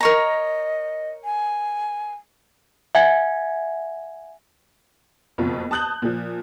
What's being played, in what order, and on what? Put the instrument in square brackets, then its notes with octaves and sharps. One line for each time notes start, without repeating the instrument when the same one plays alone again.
[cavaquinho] A#4 C#5 A#5 [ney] D#5
[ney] G#5
[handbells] E5 F#5 G#5 G#6
[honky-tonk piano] F#1 F2 B2 F4
A5 D#6 F#6 G6 F#7
A#2 F3